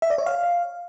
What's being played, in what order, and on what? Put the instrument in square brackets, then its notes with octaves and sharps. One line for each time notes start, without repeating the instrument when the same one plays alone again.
[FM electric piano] E5
D5
C#5
F5